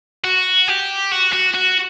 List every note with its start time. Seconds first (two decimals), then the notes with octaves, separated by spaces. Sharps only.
0.24 F#4
0.68 G4
1.12 F#4
1.33 F#4
1.54 F#4